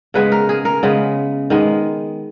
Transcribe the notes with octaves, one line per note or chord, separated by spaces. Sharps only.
C#3 G#3 B3 B4
A#4
G#4
A#4
C#3 G#3 B3
D#3 G#3 B3